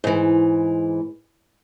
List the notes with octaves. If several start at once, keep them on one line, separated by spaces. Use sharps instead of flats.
G#2 E3